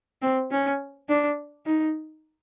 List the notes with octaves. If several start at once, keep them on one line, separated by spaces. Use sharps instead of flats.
C4
C#4
D4
D#4